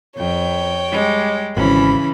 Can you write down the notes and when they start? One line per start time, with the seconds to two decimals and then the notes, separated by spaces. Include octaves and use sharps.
0.16 F2 C#5 G5
0.91 G3 G#3
1.57 G#1 C#3 E3 C#4 B5